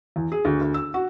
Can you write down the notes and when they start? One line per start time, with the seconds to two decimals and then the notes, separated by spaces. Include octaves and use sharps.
0.16 E2
0.32 G#4
0.45 D2
0.61 D2
0.74 E6
0.94 F#4